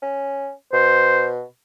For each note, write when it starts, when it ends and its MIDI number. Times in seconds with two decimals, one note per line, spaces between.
0.02 0.51 61
0.73 1.43 47
0.73 1.30 72